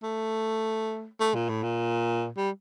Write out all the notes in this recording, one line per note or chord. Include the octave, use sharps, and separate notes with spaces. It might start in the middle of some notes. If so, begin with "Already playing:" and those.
A3
A3
A#2
A2
A#2
G3